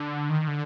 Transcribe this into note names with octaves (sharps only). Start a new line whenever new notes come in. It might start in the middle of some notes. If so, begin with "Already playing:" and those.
Already playing: D3
D#3
D3